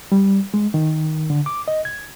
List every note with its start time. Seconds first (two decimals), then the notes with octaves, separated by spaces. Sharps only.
0.12 G3
0.54 G#3
0.74 D#3
1.30 D3
1.46 D6
1.68 D#5
1.85 G#6